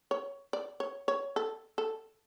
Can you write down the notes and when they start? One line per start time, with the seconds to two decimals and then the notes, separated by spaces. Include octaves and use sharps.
0.11 C#5
0.53 D5
0.80 C#5
1.08 C#5
1.36 A4
1.78 A4